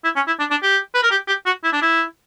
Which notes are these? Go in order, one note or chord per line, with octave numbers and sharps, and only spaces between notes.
E4
C#4
E4
D4
D4
G4
B4
A#4
G4
G4
F#4
E4
D4
E4